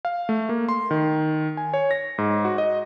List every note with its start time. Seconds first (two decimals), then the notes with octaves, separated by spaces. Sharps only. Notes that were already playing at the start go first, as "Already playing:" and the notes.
0.05 F5
0.29 A3
0.49 A#3
0.69 C6
0.91 D#3
1.57 G#5
1.74 C#5
1.91 A#6
2.18 G#2
2.45 F#4
2.58 D#5